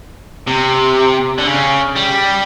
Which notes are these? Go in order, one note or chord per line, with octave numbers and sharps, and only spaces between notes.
C3
D3
C#3
G3